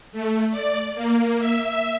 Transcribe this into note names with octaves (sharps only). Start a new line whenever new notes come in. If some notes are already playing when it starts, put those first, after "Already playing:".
A3
D5
A#3
E5